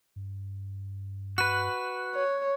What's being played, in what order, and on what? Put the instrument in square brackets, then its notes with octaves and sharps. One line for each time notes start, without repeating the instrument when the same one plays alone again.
[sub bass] G2
[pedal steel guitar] F#4 B4 [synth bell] F#6
[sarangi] C#5